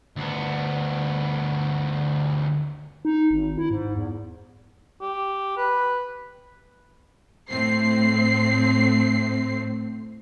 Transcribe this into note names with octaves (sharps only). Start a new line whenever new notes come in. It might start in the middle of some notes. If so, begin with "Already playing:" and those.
D2 B3
D#4
G#1
E4
G#2
E2
G4
B4
A2 C4 C7